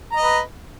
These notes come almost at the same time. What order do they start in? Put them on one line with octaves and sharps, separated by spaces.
A#5 D#5 B4